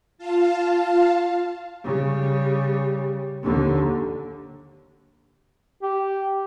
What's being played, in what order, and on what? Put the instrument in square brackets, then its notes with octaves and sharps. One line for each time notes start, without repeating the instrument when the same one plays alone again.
[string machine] F4 F5 A5
[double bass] C#3 G3
D#2 D3
[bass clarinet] G4